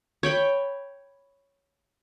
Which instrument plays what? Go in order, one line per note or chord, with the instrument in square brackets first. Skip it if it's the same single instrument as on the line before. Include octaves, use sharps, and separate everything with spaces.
[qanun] C#5 G5 B5 C#6